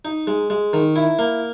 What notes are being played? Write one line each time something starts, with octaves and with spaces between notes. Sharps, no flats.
D#4
G#3
G#3
D#3
E4
A#3